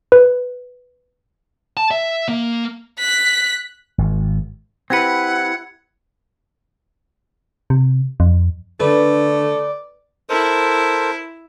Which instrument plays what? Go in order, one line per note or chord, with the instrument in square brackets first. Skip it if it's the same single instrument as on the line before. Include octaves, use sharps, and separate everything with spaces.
[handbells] B4
[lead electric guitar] A5
E5
A#3
[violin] F#6 B6
[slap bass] G#1
[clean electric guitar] C4 G4 B4 [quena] E4 [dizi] F#5 [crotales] G#6 C#7
[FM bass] C3
F2
[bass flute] D3 [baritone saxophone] A3 [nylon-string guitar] B4 [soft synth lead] D5
[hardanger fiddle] E4 [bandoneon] A4 A#4 C5